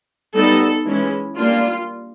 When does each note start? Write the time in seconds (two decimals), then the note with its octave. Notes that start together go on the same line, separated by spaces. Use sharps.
0.34 G3 B3 D#4 A4
0.86 E3 G#3 C#4 E4
1.37 G3 A#3 D4 F4